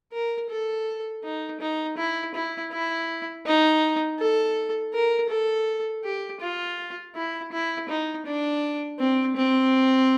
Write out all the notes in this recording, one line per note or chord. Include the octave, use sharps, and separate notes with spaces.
A#4
A4
D#4
D#4
E4
E4
E4
D#4
A4
A#4
A4
G4
F4
E4
E4
D#4
D4
C4
C4